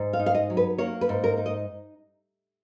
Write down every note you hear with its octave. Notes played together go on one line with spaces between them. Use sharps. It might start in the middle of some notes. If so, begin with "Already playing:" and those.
Already playing: G#2
F5
D#4
F5
D#5
F#3
B4
A#3 C#5
B4
G#2
A#4
D#4
D#5